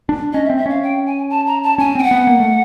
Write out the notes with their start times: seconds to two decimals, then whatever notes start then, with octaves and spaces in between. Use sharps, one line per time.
0.09 D4
0.33 C#4 D#5
0.45 E5
0.50 C4
0.57 E5
0.66 C#4 F5
0.83 G5
1.06 G#5
1.30 A5
1.47 A#5
1.63 A5
1.78 C#4 G#5
1.95 C4 G5
2.03 F#5
2.11 B3
2.27 A#3
2.40 A3